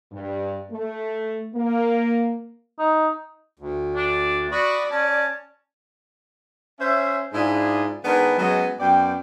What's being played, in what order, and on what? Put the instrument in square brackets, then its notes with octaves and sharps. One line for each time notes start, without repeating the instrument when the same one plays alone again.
[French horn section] G2
A3
A#3
[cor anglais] D#4
[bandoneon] D2
[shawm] D4
[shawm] F#4 [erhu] D5 [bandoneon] B5 C#6 D#6
[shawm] C#4 [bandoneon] A5
[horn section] C#4 C5 E5
G#2 D4 E4 F4 G#4
D#3 G#3 B3 D4 G#4 B4
F#3 G#3 B3 C#4 G#4 D#5
F#2 B3 D5 G5